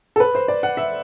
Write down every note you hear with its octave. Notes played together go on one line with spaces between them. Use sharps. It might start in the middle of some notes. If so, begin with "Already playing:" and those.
A4
B4
C5
D5
F#5
E5